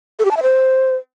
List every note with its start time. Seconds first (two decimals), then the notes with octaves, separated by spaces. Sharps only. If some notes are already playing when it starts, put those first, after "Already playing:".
0.19 A4
0.25 G4
0.31 A5
0.37 E5
0.43 C5